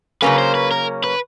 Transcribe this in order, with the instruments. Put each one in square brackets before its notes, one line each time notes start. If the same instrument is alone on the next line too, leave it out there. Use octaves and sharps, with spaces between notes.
[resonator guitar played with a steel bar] C#3 F#3 A#3 C#4 [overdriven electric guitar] B4
[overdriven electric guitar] C5
B4
A#4
B4